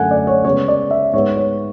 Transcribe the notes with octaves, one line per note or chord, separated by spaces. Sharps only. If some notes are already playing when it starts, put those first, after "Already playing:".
Already playing: F#2 D3 A3 F#5 G#5
D5
C#5
C#3 G#3 B3 C#5
D5
E5
G#2 G#3 B3 C#5
C#5